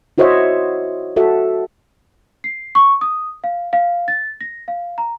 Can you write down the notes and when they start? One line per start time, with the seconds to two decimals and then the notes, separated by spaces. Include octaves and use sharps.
0.18 E4 F#4 C5 C#5 D#5 E5
1.16 F#4 A4 E5
2.44 C7
2.75 C#6
3.01 D#6
3.44 F5
3.73 F5
4.08 A6
4.41 A#6
4.68 F5
4.98 A#5